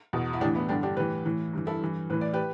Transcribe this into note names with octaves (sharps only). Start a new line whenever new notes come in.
E2 B2
E4
A2 E3 D4 G4
B3 E4
G2 D3 D4 G4
D4 G4
A2 E3 G4 B4
A2 E3
G2 E3
E4 A4
G2 E3
A2 E3 B4
D5
G4 B4